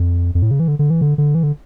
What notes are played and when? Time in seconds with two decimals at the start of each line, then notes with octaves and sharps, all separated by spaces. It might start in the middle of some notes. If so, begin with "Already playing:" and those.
Already playing: F2
0.35 F2
0.42 A2
0.51 C#3
0.60 E3
0.68 D3
0.79 D3
0.90 E3
1.01 D3
1.18 D3
1.35 E3
1.43 D3